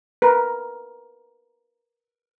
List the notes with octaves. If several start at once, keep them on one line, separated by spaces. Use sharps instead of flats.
A#4 B4